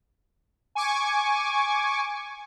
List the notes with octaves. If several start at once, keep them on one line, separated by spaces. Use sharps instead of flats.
G#5 C#6 D6